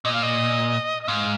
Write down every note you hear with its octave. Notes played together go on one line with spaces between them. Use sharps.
A#2 D#5
F5
D#5
D#5
G#2 F5